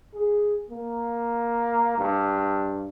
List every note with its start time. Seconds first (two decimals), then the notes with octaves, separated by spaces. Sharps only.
0.14 G#4
0.70 A#3
1.98 G2